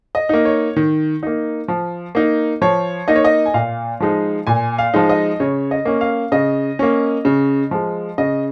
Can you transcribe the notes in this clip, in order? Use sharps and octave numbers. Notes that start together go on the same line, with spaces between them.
D#5
A#3 D#4
C#5
D#3
A#3 D#4
F3
A#3 D#4
F3 C#5
A#3 D#4 D#5
C#5
D#5
G#5
A#2 F5
F3 G#3 D#4
A#2 G#5
F5
F3 G#3 D#4
D#5
C#3 C#5
D#5
A#3 C#4
F5
C#3 D#5
A#3 C#4
C#3
F3 G#3
C#3 D#5